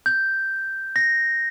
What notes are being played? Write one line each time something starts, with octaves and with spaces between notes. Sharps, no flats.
G6
A#6